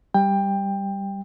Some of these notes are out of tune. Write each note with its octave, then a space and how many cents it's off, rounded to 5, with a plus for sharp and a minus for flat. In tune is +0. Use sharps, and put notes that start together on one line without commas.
G3 +0 G5 +20